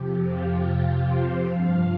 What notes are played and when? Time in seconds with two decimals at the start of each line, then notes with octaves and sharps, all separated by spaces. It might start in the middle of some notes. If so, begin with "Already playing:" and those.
Already playing: F2 C3 F3 G4
0.22 F4
0.62 G4
1.03 C5
1.43 G2 F3 F5